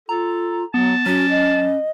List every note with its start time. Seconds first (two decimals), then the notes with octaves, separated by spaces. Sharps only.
0.09 F4 A4 A#5
0.74 F#3 B3 A5
1.06 F#3 C#4 F#4
1.29 D#5